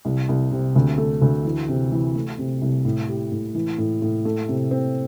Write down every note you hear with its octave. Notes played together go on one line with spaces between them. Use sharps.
C2
C2
C3
D2
A3
D2
E3
C3
E3
A3
C3
C2
A2
G4
A2
E3
A2
A2
A3
C3
C4